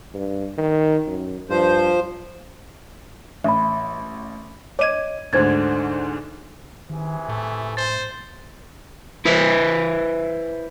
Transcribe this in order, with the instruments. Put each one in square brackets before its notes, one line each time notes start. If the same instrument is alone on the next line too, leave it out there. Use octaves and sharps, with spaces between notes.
[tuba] G2
D#3
F#2
[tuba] G2 [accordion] F3 C5
[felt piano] A1 [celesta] E5 B5
[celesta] C#5 D#5 G#6 [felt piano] D6 D#7
[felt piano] D2 G#2 D3 [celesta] C5 G#6 A6
[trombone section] C3 E3 G#4 [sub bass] D#3
[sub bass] A2 [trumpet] A3
[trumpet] C5 [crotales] A6
[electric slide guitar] E4 B4 C5 E5